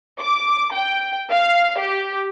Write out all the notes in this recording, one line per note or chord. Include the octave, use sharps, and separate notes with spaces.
D6
G5
F5
G4